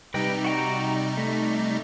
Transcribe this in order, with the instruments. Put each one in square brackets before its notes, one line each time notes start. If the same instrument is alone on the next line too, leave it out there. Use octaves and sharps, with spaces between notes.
[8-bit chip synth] C3 G3 D#4 [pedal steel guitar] B4 D#5 G5
[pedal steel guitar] F#4 G5 A#5
A3